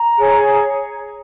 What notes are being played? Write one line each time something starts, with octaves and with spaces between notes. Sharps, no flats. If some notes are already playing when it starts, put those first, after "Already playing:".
Already playing: A#5
G#4 C#5